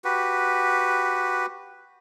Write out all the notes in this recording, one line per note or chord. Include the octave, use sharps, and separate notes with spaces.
F#4 G4 B4